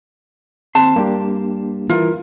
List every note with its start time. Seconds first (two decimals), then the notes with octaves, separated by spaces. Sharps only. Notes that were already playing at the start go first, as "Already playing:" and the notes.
0.75 D#2 C4 A5 C6
0.96 G2 A#3 D4 G4
1.89 E3 E4 F4 A#4